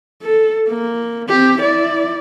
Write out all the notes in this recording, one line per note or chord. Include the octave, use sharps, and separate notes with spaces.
A4
A#3
C4 G4
E4 D5